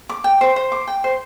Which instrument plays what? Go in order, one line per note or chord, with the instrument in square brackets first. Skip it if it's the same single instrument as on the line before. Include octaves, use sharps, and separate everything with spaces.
[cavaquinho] D6
G5
C5
C5
D6
G5
C5